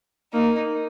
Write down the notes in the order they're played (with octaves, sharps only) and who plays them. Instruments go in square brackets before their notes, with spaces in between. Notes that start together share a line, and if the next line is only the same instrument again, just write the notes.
[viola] A#3 [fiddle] D#4